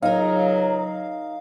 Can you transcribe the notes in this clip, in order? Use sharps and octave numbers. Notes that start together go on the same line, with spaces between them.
C#2 C#3 F#3 D#4 A#4 F5